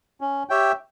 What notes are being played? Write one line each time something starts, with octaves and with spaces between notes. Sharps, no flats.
C#4
G4 C#5 E5 G5